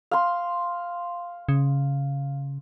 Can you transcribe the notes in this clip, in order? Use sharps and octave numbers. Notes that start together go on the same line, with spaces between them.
F5 C6
C#3